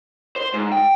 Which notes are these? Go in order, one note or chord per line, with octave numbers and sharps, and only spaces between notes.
C5
G#2
G5